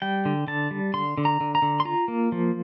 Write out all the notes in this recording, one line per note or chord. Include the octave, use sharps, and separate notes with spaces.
G3 G5
D3
D3 A5
G3
D3 C6
D3
A#5
D3
A#5
D3
C6
F4 A#5
A#3
F3